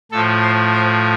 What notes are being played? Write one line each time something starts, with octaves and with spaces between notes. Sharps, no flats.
A2 F3 A4
C5
C5